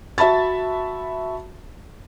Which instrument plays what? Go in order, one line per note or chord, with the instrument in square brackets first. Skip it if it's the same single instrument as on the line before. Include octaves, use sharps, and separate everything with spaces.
[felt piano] F#4 E5 A5 B5 A6